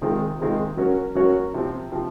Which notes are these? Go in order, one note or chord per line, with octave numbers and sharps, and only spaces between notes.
C3 D#3 G#3 C4 F4
C3 D#3 G#3 C4 F4
F#3 C#4 F#4 A#4 C#5
F#3 C#4 F#4 A#4 C#5
C3 F3 C4
C3 F3 C4